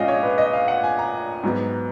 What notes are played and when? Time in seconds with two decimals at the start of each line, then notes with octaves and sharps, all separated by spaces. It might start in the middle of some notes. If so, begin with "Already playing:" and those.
Already playing: A#1 A#2 G#3 C#4 D#5 F5
0.08 C#5
0.23 B4
0.38 D#5
0.53 F5
0.68 F#5
0.84 G#5
0.99 A#5
1.43 G#2 F#3 B3